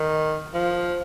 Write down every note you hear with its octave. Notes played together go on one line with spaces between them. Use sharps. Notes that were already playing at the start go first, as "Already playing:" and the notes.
Already playing: D#3
F3